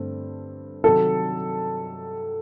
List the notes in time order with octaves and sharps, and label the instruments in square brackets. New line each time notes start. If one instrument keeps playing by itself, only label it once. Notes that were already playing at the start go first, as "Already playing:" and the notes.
Already playing: [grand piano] G2 D3 A3 C4
[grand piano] C3 D#3 F#3 [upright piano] A4